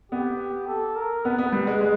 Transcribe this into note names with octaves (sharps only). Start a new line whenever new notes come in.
B3 G4
A4
A#4
B3 B4
B3
G3
G#3
G#3